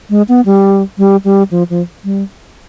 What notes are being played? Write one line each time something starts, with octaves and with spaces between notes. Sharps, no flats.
G#3
B3
G3
G3
G3
F3
F3
G3